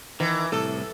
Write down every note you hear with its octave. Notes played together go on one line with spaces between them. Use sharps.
D#3 E3
C2 A2 A4